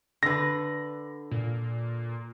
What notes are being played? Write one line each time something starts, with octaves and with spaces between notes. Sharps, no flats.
D3 B4 A#6
A#2